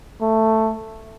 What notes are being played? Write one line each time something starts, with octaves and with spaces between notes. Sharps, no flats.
A3